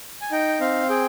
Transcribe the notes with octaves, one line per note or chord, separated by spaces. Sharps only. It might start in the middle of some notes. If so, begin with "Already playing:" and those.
G#5
D#4 G5
C4 F5
G#4 G5